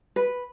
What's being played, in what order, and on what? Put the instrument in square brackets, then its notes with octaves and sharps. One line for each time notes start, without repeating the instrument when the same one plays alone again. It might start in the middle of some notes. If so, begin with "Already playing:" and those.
[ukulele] B4